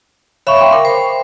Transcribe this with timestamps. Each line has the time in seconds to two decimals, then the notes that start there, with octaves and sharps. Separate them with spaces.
0.47 C#5 E5 F5 B5 C#6
0.61 G5 C6
0.72 A#4 G5 D6
0.85 C5